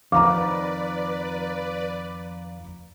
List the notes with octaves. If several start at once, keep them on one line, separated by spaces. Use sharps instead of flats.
F2 D#3 F3 B4 D5 F5 A#5 D6